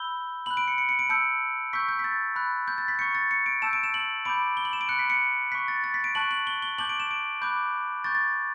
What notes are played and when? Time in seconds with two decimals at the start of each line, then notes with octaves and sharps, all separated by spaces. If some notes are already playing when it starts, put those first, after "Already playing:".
Already playing: B5 E6 G6 G7
0.46 B5 F#6 F#7
0.57 D7
0.68 C#7
0.78 C#7
0.89 C#7
0.99 D7
1.09 A5 E6 G6 C#7
1.73 C#6 E6 G6 B6
1.89 G6
1.99 B6
2.04 A6
2.36 B5 F#6
2.68 G6
2.78 A6
2.88 B6
2.99 C#6 G6 C#7
3.15 A6
3.31 C#7
3.46 D7
3.62 A5 E6 G6 E7
3.73 D7
3.83 E7
3.94 F#7
4.25 B5 D6 G6 D7
4.57 G7
4.65 F#7
4.73 E7
4.81 D7
4.89 B5 F#6 C#7
4.99 B6
5.10 C#7
5.52 C#6 F#6 B6
5.68 A6
5.84 A6
5.94 B6
6.04 D7
6.15 A5 C#6 F#6 F#7
6.31 F#7
6.47 G7
6.62 G7
6.78 A5 D6 G6 F#7
6.89 D7
7.00 E7
7.11 D7
7.42 B5 D6 F#6 G6
8.04 C#6 G6 A6
8.15 A6